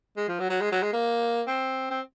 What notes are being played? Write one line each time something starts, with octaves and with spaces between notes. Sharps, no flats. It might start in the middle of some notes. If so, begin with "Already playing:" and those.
G#3
F3
F#3
F#3
G#3
F#3
G#3
A#3
C4
C4